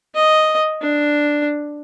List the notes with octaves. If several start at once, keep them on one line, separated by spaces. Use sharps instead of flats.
D#5
D4